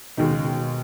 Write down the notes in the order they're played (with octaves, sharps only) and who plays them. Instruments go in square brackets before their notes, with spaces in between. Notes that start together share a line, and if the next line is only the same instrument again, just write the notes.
[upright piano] D#2 D#3 G#3 D#4 [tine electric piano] B2
[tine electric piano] C#3
B2